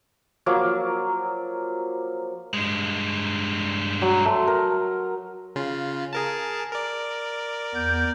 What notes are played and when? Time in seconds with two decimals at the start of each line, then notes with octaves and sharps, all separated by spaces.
0.46 F3 F#3 A#3 D6
2.54 G2 G#3
4.02 F#3
4.26 A3 C6
4.47 A#4
5.56 C#3 F4
6.13 G#4 A#4 A5
6.72 A#4 D5
7.75 E2 B3 G6